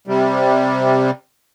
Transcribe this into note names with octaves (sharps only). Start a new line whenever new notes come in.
C3 G3